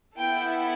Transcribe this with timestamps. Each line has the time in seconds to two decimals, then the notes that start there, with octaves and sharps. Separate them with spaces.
0.18 B3 E4 A4 G5